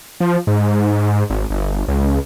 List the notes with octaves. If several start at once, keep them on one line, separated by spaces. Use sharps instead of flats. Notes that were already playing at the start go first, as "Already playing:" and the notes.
F3
G#2
G#1
G1
C#2